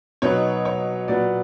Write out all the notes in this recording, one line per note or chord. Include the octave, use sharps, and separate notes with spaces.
B2 F#3 B3 D#4 C#5
C#5
A#2 F#3 B3 D5